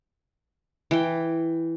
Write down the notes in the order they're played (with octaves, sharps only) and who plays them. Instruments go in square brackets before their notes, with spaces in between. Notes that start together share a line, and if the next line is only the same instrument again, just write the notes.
[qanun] E3 G5